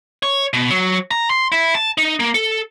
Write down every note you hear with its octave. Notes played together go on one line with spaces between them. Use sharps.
C#5
B2
F#3
A#5
C6
E4
A5
D#4
A#3
A4